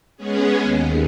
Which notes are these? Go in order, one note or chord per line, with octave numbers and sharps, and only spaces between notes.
G#3 B3 C#4 G#4
D#2